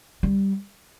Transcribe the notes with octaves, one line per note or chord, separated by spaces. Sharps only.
G3